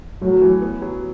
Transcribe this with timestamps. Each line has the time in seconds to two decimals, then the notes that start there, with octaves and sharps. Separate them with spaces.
0.22 A2 F#3
0.42 E3
0.62 B3
0.82 F#3